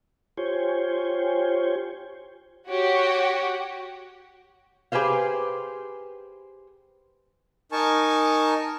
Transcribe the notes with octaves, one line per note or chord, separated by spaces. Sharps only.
F4 G4 C5 C#5 G5 G#5
F#4 G4 C#5 F#5
G4 G#4 B4 C5 F5
D#4 A#4 G#5 A5 C#6